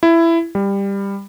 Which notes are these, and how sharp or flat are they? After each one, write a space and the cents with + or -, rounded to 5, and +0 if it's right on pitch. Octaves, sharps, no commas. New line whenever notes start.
E4 +15
G3 +15